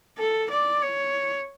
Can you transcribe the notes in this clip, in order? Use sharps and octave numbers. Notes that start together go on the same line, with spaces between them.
A4
D5
C#5